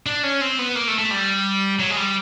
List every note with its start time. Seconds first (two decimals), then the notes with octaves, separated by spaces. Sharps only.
0.06 D4
0.23 C#4
0.41 C4
0.59 B3
0.75 A#3
0.88 A3
0.99 A3
1.11 G3
1.80 F#3
1.91 G#3
1.98 G3